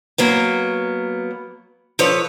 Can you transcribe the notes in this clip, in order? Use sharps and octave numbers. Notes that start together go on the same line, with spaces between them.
F#3 A#3 B3
F3 A4 B4 C#5